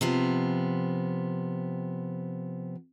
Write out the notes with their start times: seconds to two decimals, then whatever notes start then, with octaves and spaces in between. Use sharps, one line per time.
0.01 C3 F3 B3